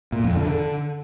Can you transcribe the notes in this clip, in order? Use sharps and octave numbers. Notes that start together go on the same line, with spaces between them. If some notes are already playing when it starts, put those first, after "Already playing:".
A#2
F2
D3
D3